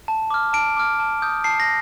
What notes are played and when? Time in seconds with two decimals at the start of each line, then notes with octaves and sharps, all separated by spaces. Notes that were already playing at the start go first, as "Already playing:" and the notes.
0.08 A5
0.30 D6 F6
0.53 A5 D7
0.77 D6 F6
1.00 A5
1.22 D#6 G6
1.44 A5 C7
1.60 A#6